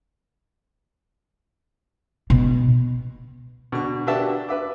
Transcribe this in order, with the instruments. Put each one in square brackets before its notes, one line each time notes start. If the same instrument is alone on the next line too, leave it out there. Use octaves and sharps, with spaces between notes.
[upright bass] B2
[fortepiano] B2 D3 C#6
D4 F#4 G4 B4 E5 A5
B4 E5 D6